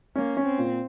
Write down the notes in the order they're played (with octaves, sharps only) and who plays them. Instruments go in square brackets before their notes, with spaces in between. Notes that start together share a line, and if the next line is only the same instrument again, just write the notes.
[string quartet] A#3 [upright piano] C#4
[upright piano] C#4
[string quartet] C4
[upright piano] A#2